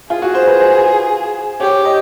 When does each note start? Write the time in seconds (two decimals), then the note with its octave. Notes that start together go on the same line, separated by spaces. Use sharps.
0.10 F4 G#4
0.22 F#4
0.35 C5
0.47 B4
0.60 C5
1.60 G4 C#5
1.85 D#5